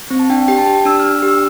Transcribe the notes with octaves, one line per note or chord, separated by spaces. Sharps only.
C4
A5
D4 G5
G4 G5
A5
G4
D4 E6
D4 F6
G4
E6